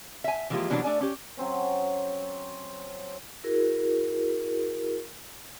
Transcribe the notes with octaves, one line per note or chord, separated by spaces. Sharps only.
E5 G#5
E3 F3 G#3 A#3 F4 G4
B2 E3 F#3 A#3 B3 D4
A3 D4 D5 G#5
C#4 G4
F#3 C4 C#4
E4 F#4 G#4 A#4